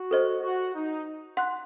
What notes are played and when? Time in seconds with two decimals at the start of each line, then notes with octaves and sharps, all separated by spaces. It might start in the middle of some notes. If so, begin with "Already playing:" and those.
Already playing: F#4
0.11 A4 C5 D#5
0.42 F#4
0.74 D#4
1.37 F#5 C6 F#6